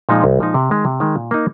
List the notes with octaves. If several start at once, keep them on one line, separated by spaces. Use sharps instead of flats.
A#2 F3 G#3 D#4
C2
A#2 F3 G#3 D#4
C3
D#3 G#3
C3
D#3 G#3
A#2
A#3 D#4